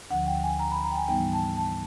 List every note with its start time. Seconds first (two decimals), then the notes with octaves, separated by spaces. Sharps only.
0.10 D2 D3 F3 F#5
0.27 G5
0.43 G#5
0.59 A#5
0.71 B5
0.84 A#5
0.91 G5
0.96 G#5
1.08 G#2 E3 G3 B3 D#4 G5
1.33 A5
1.57 A5